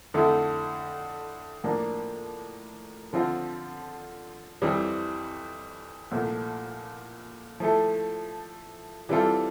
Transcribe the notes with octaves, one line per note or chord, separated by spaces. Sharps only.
F2 D3 A3 E4 A4
A2 F3 A#3 D4
D3 F3 C4 F4
F2 E3 G3 C4
C2 A#2 F3 A3
F3 A3 E4 A4
E3 G3 C4 F4 A4